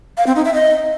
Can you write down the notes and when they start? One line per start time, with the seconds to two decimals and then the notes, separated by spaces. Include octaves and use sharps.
0.17 F5
0.27 C4
0.36 D#4
0.45 E5
0.54 D#5